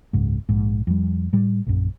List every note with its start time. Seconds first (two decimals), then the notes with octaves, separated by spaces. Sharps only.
0.13 F#1 C#2 G#2
0.49 A#1 G#2
0.87 F2 G3
1.33 A2 G3
1.67 A#1 F#2